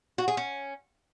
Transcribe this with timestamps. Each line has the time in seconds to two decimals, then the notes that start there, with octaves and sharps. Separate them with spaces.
0.18 F#4
0.28 G#4
0.37 C#4